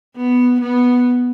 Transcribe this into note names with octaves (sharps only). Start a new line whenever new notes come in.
B3
B3